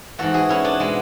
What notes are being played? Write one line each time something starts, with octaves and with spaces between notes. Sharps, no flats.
G#2 E3 F#4 A4
E4 G#4
C#4 E4
B3 D4
B2 G#3 B3